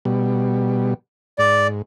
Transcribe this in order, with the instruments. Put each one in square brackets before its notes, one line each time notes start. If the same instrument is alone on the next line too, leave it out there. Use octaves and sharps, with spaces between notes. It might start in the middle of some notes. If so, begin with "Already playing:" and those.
[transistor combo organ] B2 G3
[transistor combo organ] G#2 [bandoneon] D5